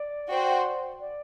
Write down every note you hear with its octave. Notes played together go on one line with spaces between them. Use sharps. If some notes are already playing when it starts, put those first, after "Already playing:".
Already playing: D5
F#4 C5 G5
D5